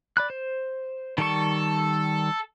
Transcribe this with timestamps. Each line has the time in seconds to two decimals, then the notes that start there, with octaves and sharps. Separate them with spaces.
0.17 D5 B5 F#6
0.30 C5
1.18 D#3 G3 A4 C#6